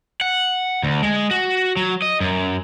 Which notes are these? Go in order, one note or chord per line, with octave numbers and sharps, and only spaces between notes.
F#5
D2
G#3
F#4
F#3
D#5
F#2